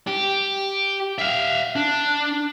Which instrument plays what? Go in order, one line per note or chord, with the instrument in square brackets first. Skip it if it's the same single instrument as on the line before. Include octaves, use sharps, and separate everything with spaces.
[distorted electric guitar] G4
E5 F5
D4